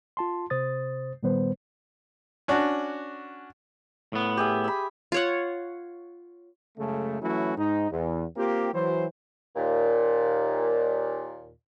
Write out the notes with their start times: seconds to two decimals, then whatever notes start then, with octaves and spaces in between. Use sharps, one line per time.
0.17 F4 A5 C6
0.50 C3 C5 D#6 A6
1.23 A#2 D#3 G3 B3 B4 C5
2.48 C#4 D4 F#4
4.13 A2 B3
4.37 G4 G#4 E5
4.64 B5 E6
5.12 F4 C#5 F#5
6.78 F#2 C#3 G#3 A3
7.21 E3 F#3 A3 C#4 E4 F#4
7.57 G#2 D#4
7.91 E2
8.37 A#3 C4 F4 G4
8.73 E3 F#3 C5
9.56 D#2 A#2